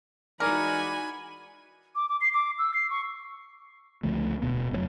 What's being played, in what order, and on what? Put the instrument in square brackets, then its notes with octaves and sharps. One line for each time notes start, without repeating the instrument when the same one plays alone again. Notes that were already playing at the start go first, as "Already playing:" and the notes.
[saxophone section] E3 G#3 D5 [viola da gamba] D#4 F#4 [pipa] A#4 [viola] G#5 B5
[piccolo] D6
D6
C7
D6
E6
C7
C#6
[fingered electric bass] C#2 D3 F3 A3
D#1 B2 B3
F1 A#2 F#3